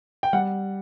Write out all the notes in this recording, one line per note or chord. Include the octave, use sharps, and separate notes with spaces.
G5
G3 F#5